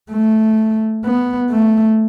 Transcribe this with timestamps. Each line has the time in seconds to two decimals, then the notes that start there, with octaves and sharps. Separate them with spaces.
0.11 A3
1.04 B3
1.51 A3